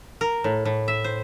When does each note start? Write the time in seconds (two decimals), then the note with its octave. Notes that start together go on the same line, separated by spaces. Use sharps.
0.21 A#4
0.44 A2
0.65 A2
0.88 E5
1.04 C5